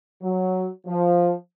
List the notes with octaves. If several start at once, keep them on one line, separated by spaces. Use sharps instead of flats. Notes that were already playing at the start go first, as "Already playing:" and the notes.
F#3
F3